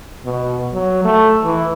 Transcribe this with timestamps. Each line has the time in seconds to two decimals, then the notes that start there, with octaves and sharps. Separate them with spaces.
0.25 B2
0.73 F#3
1.04 A3
1.44 E3